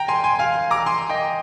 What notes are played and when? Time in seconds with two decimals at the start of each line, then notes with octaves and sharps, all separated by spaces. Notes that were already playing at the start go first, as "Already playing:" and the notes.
Already playing: G5 A#5
0.08 G#5 C6
0.24 G#5 C6
0.39 F5 G#5
0.71 A#5 D6
0.86 G#5 C6
1.09 D#5 G5